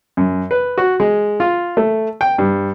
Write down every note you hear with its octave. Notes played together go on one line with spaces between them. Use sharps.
F#2
B4
F#4
G#3
F4
A3
G5
G2